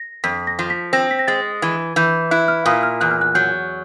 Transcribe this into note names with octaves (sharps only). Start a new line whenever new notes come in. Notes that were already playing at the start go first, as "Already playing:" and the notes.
Already playing: A#6
F2 B6
A#6
F3
B6
C4 A#6
B6
A#6
G#3 A6
E3 G#6
E3 G6
E4 F#6
F6
A#2 D#6
F6
E2 F#6
F6
F#6
F#3 G6